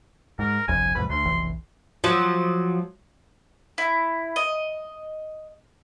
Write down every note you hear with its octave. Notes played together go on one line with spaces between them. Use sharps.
G#2 A#4
G1 C2 F2 G#5
C2 F2 G#2 B4
D2 C6
F1 B1 E3
F3 F#3
E4
D#5